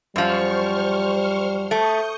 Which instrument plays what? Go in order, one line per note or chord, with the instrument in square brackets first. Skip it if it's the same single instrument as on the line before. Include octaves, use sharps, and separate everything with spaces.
[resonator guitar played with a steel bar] F#2 F3 [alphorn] G3 [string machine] C5 C#6 F6
[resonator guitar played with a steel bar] A3 [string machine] C#6 D#6 G6